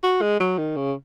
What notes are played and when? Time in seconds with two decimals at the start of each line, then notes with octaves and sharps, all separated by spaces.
0.03 F#4
0.21 G#3
0.40 F#3
0.58 D#3
0.76 C#3